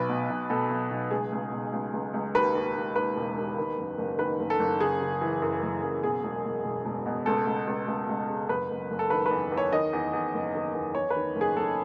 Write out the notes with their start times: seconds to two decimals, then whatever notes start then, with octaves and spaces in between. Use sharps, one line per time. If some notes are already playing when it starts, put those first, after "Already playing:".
Already playing: B1 B4
0.09 B2
0.30 B1
0.50 B2 A4
0.70 B1
0.91 B1
1.11 C#2 G#4
1.32 C#2
1.52 B2
1.73 C#2
1.93 C#2
2.14 C#2
2.34 D#2 B4
2.55 D#2
2.75 D#2
2.95 D#2 B4
3.16 E1
3.37 D#2
3.58 D#3
3.78 F#1
3.98 F#1
4.19 D#3 B4
4.40 F#1
4.50 A4
4.60 F#1
4.80 C#3 G#4
5.01 C#3
5.21 E3
5.42 F#2
5.63 F#1
5.83 F#2
6.03 B2 G#4
6.23 E1
6.45 E1
6.65 E1
6.85 E1
7.06 B2
7.26 C#2 A4
7.46 C#2
7.67 C#2
7.88 C#2
8.09 C#2
8.29 C#3
8.49 F#1 B4
8.70 F#1
8.91 F#1
8.99 A4
9.10 D#3 B4
9.26 B4
9.31 E2
9.52 E2
9.57 C#5
9.72 D#3 D#5
9.93 E2
10.13 E2
10.34 F#1
10.55 D#3
10.74 E2
10.95 E2 C#5
11.10 B4
11.16 D#3
11.36 F#1
11.41 G#4
11.57 F#1 A4